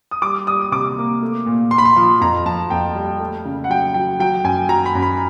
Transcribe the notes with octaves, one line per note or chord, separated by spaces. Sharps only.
D#6
G3 D6
G3 D#6
D#6
C3 D6
A#3
A3
A#2
A#2 C6
B5
C6
F3 C6
F2 A#5
F2 A5
F2 G5
G3
A3
C#3
F#5
F#3 G5
F#3 G5
F#3 G5
F#2 G#5
F#3 A#5
B5
F#2
B5